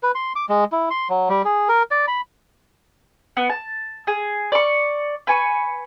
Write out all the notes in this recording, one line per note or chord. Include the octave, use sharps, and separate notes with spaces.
B4
C6
D6
G#3
E4
C6
F#3
G3
G#4
A#4
D5
B5
B3
A5
G#4
D5 C#6
B4 G#5 C#6